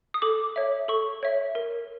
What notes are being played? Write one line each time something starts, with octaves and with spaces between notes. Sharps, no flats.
D#6
A4 D6
C#5 E5
A4 C#6
C#5 E5
A#4